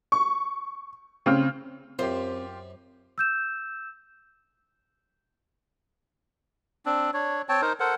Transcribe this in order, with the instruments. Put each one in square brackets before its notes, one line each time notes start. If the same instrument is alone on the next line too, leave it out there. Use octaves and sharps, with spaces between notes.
[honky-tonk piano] C#6
C#3 C4 F6
[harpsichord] F#2 [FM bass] C4 [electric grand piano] F4 G4 [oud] C5
[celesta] E6 G6 E7
[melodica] C4 D4
D4 C#5
C4 C#5 G5 A5
D#4 A#4 C5
A4 A#4 C5 F#5